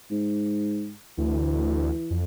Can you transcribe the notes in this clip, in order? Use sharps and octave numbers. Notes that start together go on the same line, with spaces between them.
G#2
D2 E3
F2